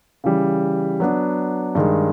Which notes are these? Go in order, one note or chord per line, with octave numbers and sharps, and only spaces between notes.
C#3 E3 G3
F#3 B3 D4
G2 D#3 G#3